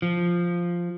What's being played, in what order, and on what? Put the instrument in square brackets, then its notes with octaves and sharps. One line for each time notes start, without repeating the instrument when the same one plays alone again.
[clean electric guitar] F3